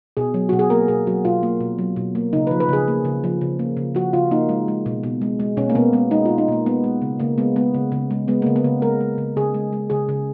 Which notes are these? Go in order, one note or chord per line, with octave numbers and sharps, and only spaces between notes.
B2 G#4
F#3
B2 F#4
G#4
A#3 A#4
B2 G#4
F#3 F#4
B2 F4
A#3
B2
F#3
B2
A#3
C#3 D#4
F3 B4
B4
C#3 G#4
A#3
C#3
F3
C#3
A#3
C#3
F3 F#4
C#3 F4
A#3 D#4
G#3
G#3
B2
B2
G#3
G#3
B2 C#4
A#3
B2 B3
G#3 B3
G#3 D#4
B2 F4
D#4
B2 A#3
G#3 B3
G#3
C#3
C#3 A#3
G#3 B3
G#3 B3
C#3
C#3
G#3
G#3 B3
C#3 A#3
B3
C#3
G#3 A#4
G#3
C#3
C#3 G#4
G#3
G#3
C#3 G#4
C#3